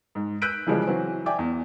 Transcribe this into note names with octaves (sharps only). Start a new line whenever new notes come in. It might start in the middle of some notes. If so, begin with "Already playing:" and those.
G#2
E6 F#6 G6 B6 D7 D#7
C#3 E3 F3 G3 G#3
E3 F#3 C4
D5 E5 G5 G#5 D6
E2